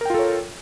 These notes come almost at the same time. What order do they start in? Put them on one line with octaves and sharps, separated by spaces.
A#4 G5 F4 A4 C#5